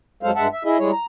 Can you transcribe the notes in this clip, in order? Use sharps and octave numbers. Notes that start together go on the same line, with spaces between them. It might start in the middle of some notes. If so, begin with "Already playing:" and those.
F2 F#3 G#3 A4 C5 F5
G2 G#3 E5 F#5 A5
E5
E4 G#4 D#5 E5
G3 G#3 E4 G#4 C#5
A#5